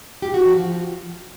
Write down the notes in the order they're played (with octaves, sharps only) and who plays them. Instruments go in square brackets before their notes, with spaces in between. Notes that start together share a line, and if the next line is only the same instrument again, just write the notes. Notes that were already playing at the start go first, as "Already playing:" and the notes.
[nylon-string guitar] G4
F#4
F3